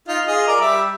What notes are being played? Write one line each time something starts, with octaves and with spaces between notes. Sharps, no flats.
D#4 F4
F4 G#4 D#5
A#4 D5
G3 E5 D6